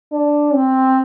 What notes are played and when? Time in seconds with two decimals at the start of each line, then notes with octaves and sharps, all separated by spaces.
0.12 D4
0.54 C4